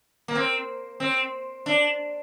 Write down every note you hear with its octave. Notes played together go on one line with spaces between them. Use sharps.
A#3
C4
C4
D4